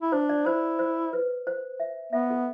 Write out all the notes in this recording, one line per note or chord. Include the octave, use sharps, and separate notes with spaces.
E4
D4 C5
D5
E4 C5
C5
B4
C5
E5
B3 E5
A4